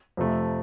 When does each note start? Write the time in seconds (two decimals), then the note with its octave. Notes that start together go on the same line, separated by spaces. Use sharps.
0.17 F2 C3 F3 A3